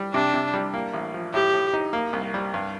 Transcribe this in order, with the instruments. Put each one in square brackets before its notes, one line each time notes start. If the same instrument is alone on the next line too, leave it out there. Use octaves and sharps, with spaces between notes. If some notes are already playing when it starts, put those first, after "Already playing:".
Already playing: [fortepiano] G3
[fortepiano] C3 [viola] D4
[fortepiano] C3
G3
A#3
A1
F3
[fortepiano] A2 [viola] G4
[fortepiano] A2
D#4
A#3
C2
G3
G2